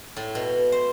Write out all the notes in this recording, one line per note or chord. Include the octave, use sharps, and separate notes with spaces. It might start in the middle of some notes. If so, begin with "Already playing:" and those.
A2
B2
C5